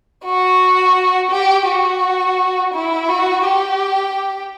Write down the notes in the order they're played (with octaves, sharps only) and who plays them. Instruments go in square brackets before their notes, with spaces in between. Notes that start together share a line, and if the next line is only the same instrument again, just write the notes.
[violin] F#4
G4
F#4
E4
F#4
G4